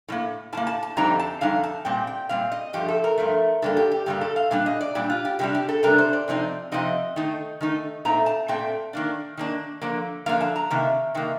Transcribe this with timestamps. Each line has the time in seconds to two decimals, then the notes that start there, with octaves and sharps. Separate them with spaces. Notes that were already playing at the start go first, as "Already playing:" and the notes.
0.08 A2 G3 A#3
0.53 A2 G3 A5
0.57 A#3
0.67 A5
0.83 A5
0.97 F2 D3 G3 C4 D#4 A#5
1.20 A5
1.41 F2 D3 G3 D#4 F5
1.64 A5
1.85 A#2 G3 C4 G5
2.07 G5
2.29 A#2 G3 C4 F5
2.52 D#5
2.73 G2 F3 A3 G4
2.89 A4
3.04 A#4
3.18 G2 F3 A3
3.62 G2 D3 G3 A#3 A4
3.77 G4
3.92 G4
4.06 G2 D3 G3 A#3 G4
4.21 A4
4.36 F5
4.51 A#2 G3 D4 F5
4.66 D#5
4.81 D5
4.95 A#2 G3 D4 G4
5.10 F4
5.25 G4
5.39 C3 G3 D4 G4
5.55 G4
5.69 A4
5.83 C3 G3 D4 A#4
5.98 C5
6.13 D5
6.28 C3 F3 C4 D#4
6.72 C3 F3 C4 D#4 D#5
7.16 D#3 A3 D#4
7.61 D#3 A3 D#4
8.05 A#2 A3 C4 D#4 A#5
8.26 A5
8.48 A#2 A3 C4 G5
8.93 D#3 A#3 D4
9.37 D#3 A#3 D4
9.82 D3 F3 A#3
10.26 D3 F3 A#3 F5
10.41 A5
10.56 A#5
10.70 C3 D#3 A#3
11.15 C3 D#3 A#3